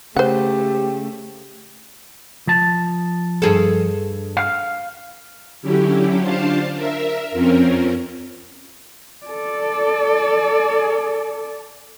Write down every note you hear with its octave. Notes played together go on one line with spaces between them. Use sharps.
C#3 A3 G4 C5 F#5
F3 A5
G2 G#4 A4
F5
D3 F#3 C#4 E4 G4
D4 F4 C5 F5 A5
A#4 E5
F2 F3 C4 C#4 A#4
A4 D5